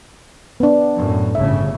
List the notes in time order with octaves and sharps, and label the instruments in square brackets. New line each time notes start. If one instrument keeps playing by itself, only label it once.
[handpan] B3 D4
[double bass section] F#2 A2
[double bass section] G1 A2 C#3 [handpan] E5